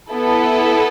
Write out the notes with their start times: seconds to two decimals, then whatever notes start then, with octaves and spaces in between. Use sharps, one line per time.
0.10 B3 E4 A4